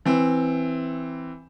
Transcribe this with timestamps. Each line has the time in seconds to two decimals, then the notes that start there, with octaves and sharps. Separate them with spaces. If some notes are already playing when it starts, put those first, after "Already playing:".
0.06 E3 C4